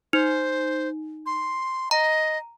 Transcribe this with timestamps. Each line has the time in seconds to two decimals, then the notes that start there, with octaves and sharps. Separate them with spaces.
0.13 D#4 C5
1.26 C6
1.91 D#5 A#5